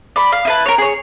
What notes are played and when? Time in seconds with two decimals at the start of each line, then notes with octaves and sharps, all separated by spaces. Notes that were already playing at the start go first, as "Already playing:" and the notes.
0.16 D5 B5
0.32 F5
0.45 E4 B4 A5
0.66 A#4 C#5
0.78 G#4 C#5